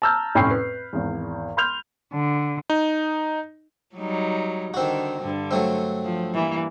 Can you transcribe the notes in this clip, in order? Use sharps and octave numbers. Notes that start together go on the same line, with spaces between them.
A5 A#5 E6 F6 G6
F1 A2 C#4 G5 C6 C7
B4
G#1 E2
B5 C6 F6 G6 F7
D3
D#4
F#3 G3 D#4
D3 D#3 C4 F#4
G2 D3
F#3 A3 C4
F3
E3 G3 A#3